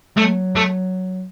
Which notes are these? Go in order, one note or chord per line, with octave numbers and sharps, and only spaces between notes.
F#3 A3
A3